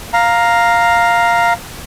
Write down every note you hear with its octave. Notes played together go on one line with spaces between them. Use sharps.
F5 A#5